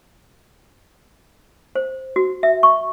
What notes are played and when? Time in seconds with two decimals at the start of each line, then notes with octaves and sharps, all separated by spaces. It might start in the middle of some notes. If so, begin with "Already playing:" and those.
1.75 C5
2.16 F#4
2.43 E5
2.63 C#6